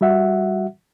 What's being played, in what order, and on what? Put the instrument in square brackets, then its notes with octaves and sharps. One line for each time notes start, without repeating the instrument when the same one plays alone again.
[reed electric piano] G3 F#4 E5 F#5